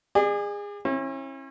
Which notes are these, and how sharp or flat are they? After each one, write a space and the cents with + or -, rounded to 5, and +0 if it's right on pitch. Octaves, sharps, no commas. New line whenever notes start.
G#4 -25 D5 +40
C#4 -40 E4 +0